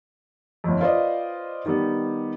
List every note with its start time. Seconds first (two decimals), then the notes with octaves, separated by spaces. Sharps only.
0.64 G1 F2
0.81 F4 B4 C5 D5 D#5
1.66 D#3 G3 B3